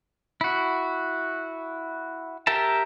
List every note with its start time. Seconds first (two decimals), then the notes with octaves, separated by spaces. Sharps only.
0.41 E4 F#4
2.47 G4 A#4 E5 A5